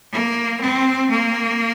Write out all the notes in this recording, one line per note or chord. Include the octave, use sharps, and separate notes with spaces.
A#3
C4
A#3